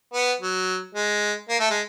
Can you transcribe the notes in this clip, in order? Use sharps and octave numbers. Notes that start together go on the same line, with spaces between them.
B3
F#3
G#3
A#3
A3
G#3